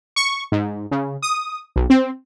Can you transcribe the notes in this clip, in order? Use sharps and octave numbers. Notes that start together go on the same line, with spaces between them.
C#6
G#2
C#3
D#6
B1
C4